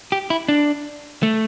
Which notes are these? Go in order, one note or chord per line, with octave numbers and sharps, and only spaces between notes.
G4
E4
D4
A3